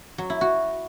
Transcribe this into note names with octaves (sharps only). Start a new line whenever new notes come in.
F#3
E4
F#4